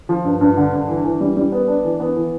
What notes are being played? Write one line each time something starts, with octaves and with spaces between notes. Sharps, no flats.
F3
G2
G2
D3
G2
E3
E3
G3
G3
B3
D4
E3
B3
E3